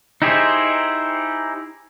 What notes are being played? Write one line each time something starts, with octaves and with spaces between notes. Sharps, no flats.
D#4 E4 G4 G#4 C5